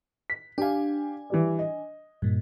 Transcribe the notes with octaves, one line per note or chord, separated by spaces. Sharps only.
B6
D4 G4 F5 G#5
E3 G3 D5
D#5
G2 A#2